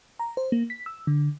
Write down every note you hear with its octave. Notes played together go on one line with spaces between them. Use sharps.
A#5
C5
A#3
B6
E6
D3